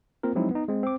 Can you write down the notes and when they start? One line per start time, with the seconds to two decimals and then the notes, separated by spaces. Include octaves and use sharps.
0.23 A#3 C4 F4 A#4
0.35 F3 F#3 G#3 C4 D#4 E4
0.51 B3 D#4
0.68 G#3 C4
0.83 C4 D6